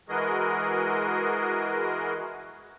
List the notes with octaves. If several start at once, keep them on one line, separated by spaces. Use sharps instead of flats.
E3 G#3 F#4 G#4 A#4 D#5